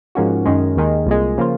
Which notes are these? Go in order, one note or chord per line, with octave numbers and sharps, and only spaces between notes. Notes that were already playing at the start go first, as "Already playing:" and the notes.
G#2 F3 A#3 C#4 F#4
F#2 D#3 G#3 C#4
D#2 D#3 G#3
C2 A#2 G#3
C#3 F3 A#3 F4